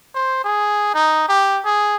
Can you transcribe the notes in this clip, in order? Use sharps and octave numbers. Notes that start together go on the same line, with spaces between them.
C5
G#4
D#4
G4
G#4